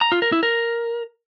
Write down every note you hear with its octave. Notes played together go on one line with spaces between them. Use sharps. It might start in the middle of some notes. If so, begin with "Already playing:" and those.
A#5
F4
A#4
E4
A#4